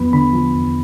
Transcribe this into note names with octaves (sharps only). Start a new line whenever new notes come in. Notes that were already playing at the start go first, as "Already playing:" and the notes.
Already playing: E2 F3 B3 B5
D3 B5
F3
E2